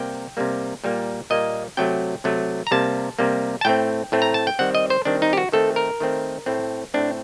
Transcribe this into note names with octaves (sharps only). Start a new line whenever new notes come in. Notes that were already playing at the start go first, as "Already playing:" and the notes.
Already playing: C3 G3 A#3 G5
C3 G3 A#3
A#2 G3 A#3
A#2 G3 A#3 D#5
C3 F#3 A3 G5
C3 F#3 A3
A#5
C3 G3 A#3 A5
C3 G3 A#3
A5
A2 A3 C4 G5
A2 A3 C4
A#5
A5
G5
D#3 G3 C4 F#5
D#5
C5
D#3 G3 C4 D4
D#4
G4
F#4
D#3 A3 C4 A4
A#4
D#3 A3 C4
A2 A3 C4
A2 A3 C4 D4